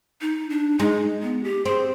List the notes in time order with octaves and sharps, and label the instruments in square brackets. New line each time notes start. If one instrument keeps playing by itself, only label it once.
[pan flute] D#4
D4
[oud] G#3 [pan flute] D#4
[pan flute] B3
G4
[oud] C4 [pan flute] G#4